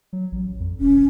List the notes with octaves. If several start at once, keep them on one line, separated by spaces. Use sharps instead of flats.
F#3
A1
F2
E1 C#4